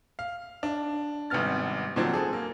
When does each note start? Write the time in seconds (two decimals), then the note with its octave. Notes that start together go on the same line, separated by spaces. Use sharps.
0.19 F5
0.63 D4
1.30 G#1 C3 G3 B3 F6 A6
1.96 A#2 D3 F3 F#3 C4 D4
2.13 G#4 A4
2.33 A#3